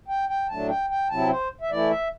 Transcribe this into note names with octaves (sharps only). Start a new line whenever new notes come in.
G5
G5
A2 F#3 A3 D4 A5
G5
G5
C3 F#3 C4 E4 A5
C5
E5
E3 A3 E4 D5
E5